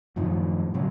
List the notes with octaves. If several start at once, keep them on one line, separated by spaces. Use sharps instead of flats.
F#2 A2 D#3 F3
A2 D3 F#3 C#4